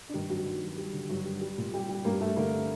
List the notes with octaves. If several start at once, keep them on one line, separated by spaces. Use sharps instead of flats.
D4
G2 D#3 D#4
G2 F#3 F#4
D#3
F#3
G3
D3
G2 F#3 F#4
G3
G3
A#2
G3 G4
G3 G4
G2 A#3 A#4
G2 A3 A4
D3 A#3 A#4